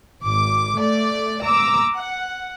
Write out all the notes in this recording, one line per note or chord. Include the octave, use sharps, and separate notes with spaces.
G#1 D6
A3 D5
A#5 D6 E6
F#5